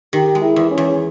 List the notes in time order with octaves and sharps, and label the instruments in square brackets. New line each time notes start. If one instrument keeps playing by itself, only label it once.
[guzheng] D#3 [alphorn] G4
[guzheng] G#3
[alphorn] E4
[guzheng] E2
[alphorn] C#4
[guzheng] E2